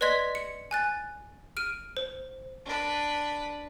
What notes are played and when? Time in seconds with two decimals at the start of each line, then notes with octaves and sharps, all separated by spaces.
0.01 B4 D5 D#5 C6 G#6 B6
0.35 C#7
0.71 G#5 F#6 A6
1.57 F6 D7 D#7
1.97 C5
2.65 D4 B4